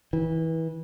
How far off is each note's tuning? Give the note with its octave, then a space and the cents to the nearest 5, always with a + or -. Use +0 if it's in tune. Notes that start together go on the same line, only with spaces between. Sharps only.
E3 -25